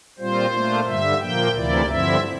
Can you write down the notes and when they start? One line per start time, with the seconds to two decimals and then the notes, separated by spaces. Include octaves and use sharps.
0.18 A#2 G3 C4 F4 C5
0.53 A#2 A3 D4 F4
0.86 G2 D3 G3 E5
1.20 A#2 F3 A#3 G5
1.55 D2 C3 E3 A#3 E4 D5
1.89 G2 D3 F3 C4 E4 E5